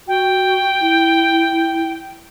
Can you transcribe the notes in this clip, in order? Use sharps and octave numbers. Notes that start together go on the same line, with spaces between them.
F#4 G5
E4